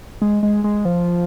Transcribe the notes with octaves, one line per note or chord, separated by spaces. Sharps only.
G#3
G#3
G#3
F3